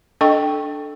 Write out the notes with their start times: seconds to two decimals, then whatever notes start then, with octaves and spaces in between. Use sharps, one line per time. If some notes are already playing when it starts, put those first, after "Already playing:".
0.21 D4 A4 D#5 G5 C#6